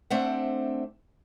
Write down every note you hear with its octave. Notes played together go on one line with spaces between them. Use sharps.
A3 C4 D4 C5 E5 F#5